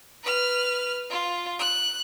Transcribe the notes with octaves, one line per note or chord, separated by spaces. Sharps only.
B4 F6
F4
F#6